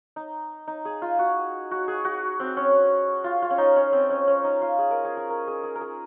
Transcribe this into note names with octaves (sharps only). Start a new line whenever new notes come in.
D#4
D#4
G#4
F4
F#4
F#4
G#4
F#4
C4
C#4
F4
F4
C#4
D#4
C#4
C4
C#4
C#4
D#4
F4
G#4
A#4
G#4
G#4
A#4
G#4
G#4
A#4
G#4